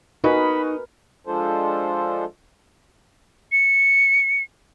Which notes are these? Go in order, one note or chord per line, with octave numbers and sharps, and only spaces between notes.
D#4 F#4 A#4 B4 D#5 G#5 B5
F3 G#3 D4 F4 A4 C5
C#7